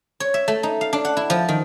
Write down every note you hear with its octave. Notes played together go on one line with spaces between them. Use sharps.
C#5
E5
A3
D#4
F5
D4
F#5
E4
F3
D#3